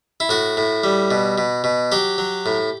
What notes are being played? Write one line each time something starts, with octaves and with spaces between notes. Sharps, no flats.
E4
A2 F#4
A2
G3
B2
B2
B2
F#3 G4
F#3
A2